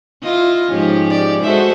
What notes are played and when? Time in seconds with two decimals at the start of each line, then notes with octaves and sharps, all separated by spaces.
0.23 E4 F4 D#5
0.70 G#2 F3 C#4 G4
1.10 D5
1.43 G#3 F#4 A4 C5 E5